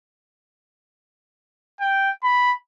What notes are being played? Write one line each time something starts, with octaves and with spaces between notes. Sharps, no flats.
G5
B5